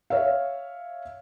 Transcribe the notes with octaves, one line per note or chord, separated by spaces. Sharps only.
C#5 E5 F5